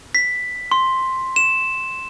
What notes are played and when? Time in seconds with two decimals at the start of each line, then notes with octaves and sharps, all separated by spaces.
0.15 B6
0.71 C6
1.36 E7